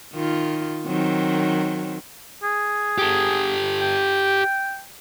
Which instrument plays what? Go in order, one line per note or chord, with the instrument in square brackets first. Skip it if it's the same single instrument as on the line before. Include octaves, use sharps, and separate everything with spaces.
[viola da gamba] D#3 F4
D#3 F#3 C4
[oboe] G#4
[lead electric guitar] G4 A4
[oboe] G5